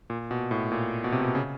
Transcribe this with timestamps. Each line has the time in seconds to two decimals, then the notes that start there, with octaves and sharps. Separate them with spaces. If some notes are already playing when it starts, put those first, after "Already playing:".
0.10 A#2
0.31 B2
0.51 A2
0.72 A#2
1.04 B2
1.12 C3
1.23 B2
1.35 C#3